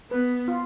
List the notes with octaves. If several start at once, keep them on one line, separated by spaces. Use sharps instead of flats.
B3 B4
F4